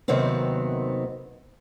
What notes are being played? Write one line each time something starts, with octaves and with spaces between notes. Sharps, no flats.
D#2 C3 D#3 F#3 B3 C4